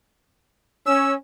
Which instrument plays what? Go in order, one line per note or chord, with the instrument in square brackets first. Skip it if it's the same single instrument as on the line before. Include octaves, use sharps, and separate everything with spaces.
[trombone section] C#4 [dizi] E6